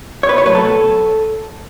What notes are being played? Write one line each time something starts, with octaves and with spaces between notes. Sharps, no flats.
C#5
B2 B4
C#5
F#3 A3 B4
A4
B2